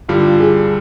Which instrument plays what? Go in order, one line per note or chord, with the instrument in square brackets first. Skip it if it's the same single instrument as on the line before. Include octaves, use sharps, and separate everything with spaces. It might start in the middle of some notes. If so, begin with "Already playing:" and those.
[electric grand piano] G2 D3 G3 [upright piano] F4
[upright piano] G#4